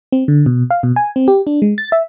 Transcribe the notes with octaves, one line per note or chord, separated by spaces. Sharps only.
C4
D3
B2
F5
B2
G#5
C4
G4
D4
G#3
A6
E5